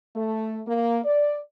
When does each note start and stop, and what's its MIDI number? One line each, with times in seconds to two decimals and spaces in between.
0.16 0.61 57
0.68 1.00 58
1.05 1.39 74